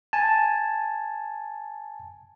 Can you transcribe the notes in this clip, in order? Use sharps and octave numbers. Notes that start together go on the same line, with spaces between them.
G#5 A5